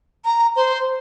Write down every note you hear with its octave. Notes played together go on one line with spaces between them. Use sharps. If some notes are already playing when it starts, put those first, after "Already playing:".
A#5
C5